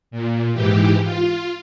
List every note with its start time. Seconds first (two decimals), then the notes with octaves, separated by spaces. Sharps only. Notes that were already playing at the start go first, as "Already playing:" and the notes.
0.11 A#2
0.53 G#2 E3 G4
1.02 F4